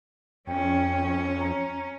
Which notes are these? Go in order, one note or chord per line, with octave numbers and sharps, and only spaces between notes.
F2 C#4 G5
A#5